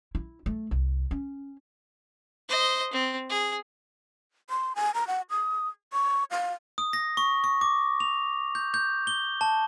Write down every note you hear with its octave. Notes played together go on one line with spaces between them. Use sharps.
E4
A3
C2
C#4
C5 D#5
C4
G#4
C6
G#5
A#5
F#5
D#6
C#6
F5
D#6
A#6
C#6
C#6
D6
F7
G6
G6
G7
A5